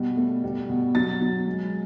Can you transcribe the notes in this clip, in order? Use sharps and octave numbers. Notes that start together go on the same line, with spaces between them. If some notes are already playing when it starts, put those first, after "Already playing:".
Already playing: B2 G3
A3
G3
B2
F#3 A6
F#3
G#3